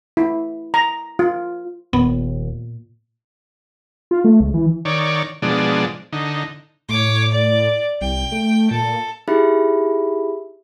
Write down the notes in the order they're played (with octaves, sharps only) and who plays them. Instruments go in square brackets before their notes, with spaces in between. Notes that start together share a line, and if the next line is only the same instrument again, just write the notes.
[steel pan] E4
A#5
F4
[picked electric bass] D#1 G#1 D#2 [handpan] A#2 [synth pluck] B3
[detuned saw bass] F4
A3
C#2
E3
[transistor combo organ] D#3 C#5 D5
B2 F3 G#3 D4
D3 D#4
[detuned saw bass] A2 [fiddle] C#5 D6
[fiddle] D5
[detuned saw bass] C2 [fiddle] G5
[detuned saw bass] A3
[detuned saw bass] A#2 [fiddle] A4
[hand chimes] D#4 E4 G4 G#4 E5 B5